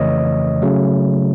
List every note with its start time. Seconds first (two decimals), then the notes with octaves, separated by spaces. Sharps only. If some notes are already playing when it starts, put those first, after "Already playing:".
Already playing: F2 C#3 E3 A3 C#5 D#5
0.62 C#3 F#3 A3